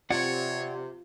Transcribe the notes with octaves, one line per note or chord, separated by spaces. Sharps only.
C3 F4 C#5 D5 F#5